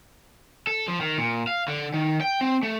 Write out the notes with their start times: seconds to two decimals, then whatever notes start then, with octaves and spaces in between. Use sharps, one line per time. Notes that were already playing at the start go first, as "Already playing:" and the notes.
0.67 A4
0.88 F3
1.01 D#3
1.18 A#2
1.47 F5
1.68 D3
1.94 D#3
2.21 G5
2.41 C4
2.63 A3